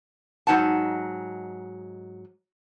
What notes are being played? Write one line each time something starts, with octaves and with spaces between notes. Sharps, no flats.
G#2 F#3 D#4 F#5 A5